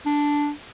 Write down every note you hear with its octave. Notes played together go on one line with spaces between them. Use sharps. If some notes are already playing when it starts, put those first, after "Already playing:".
D4